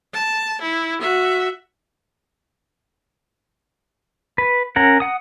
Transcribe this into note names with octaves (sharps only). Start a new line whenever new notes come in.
A5
E4
F#4 E5
B4
C#4 A#4 F#5
F#5 D#6